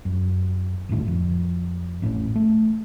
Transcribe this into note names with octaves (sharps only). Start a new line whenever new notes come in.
F#2
D#1 G#1 A2 D3
F2
A1 A2 F3 C#4
A3